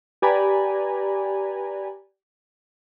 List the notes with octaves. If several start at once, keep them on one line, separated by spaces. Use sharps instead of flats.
G4 B4 D5 G#5 A#5 B5